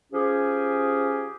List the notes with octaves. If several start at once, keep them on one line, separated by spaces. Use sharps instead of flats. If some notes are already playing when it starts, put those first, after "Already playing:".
F3 C#4 G4 G#4